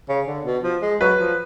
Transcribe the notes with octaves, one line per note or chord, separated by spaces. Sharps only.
C#3
D3
B2
F3
G#3
F#3 B4
F3